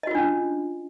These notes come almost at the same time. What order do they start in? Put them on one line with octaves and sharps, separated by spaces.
D#5 F#4 F4 D4 C#4